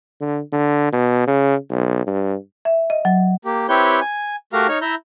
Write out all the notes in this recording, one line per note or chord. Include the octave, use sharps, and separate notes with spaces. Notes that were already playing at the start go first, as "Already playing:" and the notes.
D3
D3
B2
C#3
B1
G2
E5
D#5
F#3
A#3 G4
C4 E4 G4 B4 C#5 G6
G#5
A3 F#4 G4 A#4 F5 A#5
D#4 C#5 F6
E4 E5 A#5 G6